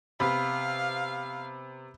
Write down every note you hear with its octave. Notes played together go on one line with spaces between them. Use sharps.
C3 B3 F5 B5